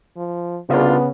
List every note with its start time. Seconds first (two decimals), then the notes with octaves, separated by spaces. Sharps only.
0.17 F3
0.69 C2 C#3 B3 D4 F4